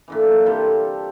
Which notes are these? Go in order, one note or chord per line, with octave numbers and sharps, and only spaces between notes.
A#2 D3 E3
C3 G3 F4 A4